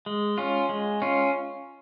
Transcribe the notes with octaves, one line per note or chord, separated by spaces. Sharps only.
G#3
C#4 F4
G#3
C#4 F4